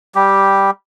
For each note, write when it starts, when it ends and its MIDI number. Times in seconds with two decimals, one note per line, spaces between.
0.15 0.71 55
0.15 0.71 67